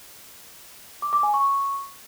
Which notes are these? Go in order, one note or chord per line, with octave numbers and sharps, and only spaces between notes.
D6
D6
G#5
C#6